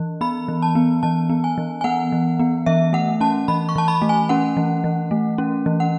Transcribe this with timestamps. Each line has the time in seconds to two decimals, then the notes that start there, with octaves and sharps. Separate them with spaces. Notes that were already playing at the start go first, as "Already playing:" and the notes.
Already playing: E3
0.21 B3 B5
0.48 E3
0.62 A5
0.75 B3
1.03 E3 A5
1.29 B3
1.44 G#5
1.58 E3
1.81 G#5
1.84 B3 F#5
2.12 E3
2.40 B3
2.66 E3 E5
2.93 A3 F#5
3.21 C#4 A5
3.48 E3 B5
3.69 C#6
3.76 E3 A5
3.88 B5
4.02 A3
4.09 G#5
4.29 C#4 F#5
4.57 E3
4.84 E3
5.11 A3
5.38 C#4
5.66 E3
5.80 F#5